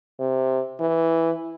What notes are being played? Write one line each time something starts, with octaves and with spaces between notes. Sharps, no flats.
C3
E3